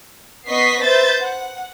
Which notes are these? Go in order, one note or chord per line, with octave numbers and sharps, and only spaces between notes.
B3 D#5 C#6 B6 C7
B4 C5 E5 G6 A6
F#5